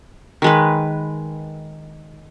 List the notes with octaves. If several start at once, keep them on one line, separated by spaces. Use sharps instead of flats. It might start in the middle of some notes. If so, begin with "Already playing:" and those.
D#3 G#3 B4